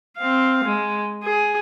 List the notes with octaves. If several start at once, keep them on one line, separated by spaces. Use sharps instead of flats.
C4 F5
G#3
G#4